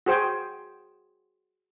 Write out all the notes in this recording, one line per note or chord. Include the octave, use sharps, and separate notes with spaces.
F#4 G#4 C5 G5 G#5